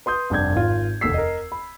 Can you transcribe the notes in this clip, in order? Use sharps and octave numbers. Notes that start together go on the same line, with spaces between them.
B4 C6 D#6 G6
F1 G2 C3 G6 G#6
G#1 F4
F1 D#2 A4 E6 B6 C7
A#4 D#5
B5